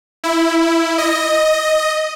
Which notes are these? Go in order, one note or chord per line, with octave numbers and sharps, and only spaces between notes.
E4
D#5